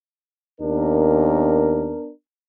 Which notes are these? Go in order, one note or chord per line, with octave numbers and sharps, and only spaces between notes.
D#2 B3 D4 A#4